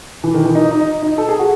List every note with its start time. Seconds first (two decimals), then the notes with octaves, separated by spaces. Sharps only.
0.24 E3
0.34 D#3
0.45 E3
0.55 D#4
0.71 D#4
1.02 D#4
1.18 A4
1.29 G#4
1.39 F#4